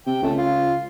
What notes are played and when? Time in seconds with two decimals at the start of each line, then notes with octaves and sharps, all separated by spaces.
0.07 C3 G5
0.23 C#2 A3
0.38 F4